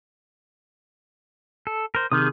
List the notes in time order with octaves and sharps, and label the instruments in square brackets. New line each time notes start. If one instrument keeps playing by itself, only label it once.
[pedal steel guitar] A4
A#4 C5
[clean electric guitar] C3 D#3 [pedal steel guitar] G#4 D#6